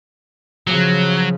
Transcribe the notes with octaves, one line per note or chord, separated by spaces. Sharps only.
C#3 F3 F#3